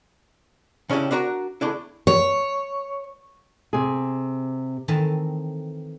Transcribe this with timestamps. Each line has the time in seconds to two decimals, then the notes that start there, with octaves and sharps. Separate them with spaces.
0.89 C#3 C#4 D4 E4 G4
1.11 D4 E4 F#4 A#4 A#5
1.61 E2 A3 D4 E4
2.07 C#5
3.73 C3 G#4
4.88 D#3 E3 A3 C4 D#4 A5